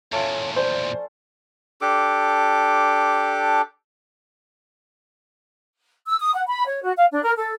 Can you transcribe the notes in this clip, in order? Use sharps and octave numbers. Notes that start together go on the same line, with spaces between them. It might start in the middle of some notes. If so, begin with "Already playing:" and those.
E2 A#2 A3 C#4 F4 C#5
C5 D5
D4 G4 A4 D6
E6
D#6
F#5
B5
C#5
F#4
F5
D4
A#4
A4